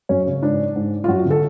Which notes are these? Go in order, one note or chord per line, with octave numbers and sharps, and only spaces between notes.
F#2 C#4
C#3
G#2 D4
G#2
F4
F#2 F#4
D3
A4